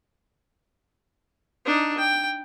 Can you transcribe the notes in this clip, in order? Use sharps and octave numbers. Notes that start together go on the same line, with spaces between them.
D4 D#4
G5